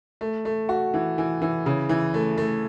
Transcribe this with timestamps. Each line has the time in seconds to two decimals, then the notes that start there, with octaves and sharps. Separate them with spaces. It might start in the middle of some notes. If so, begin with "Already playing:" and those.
0.21 A3
0.45 A3
0.69 F#4
0.94 E3
1.18 E3
1.42 E3
1.66 C#3
1.89 E3
2.14 A3
2.38 A3